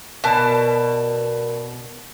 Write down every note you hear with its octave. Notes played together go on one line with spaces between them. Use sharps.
B2 A#4 D5 A5